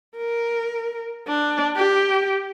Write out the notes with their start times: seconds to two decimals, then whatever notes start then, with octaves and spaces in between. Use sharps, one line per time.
0.17 A#4
1.27 D4
1.76 G4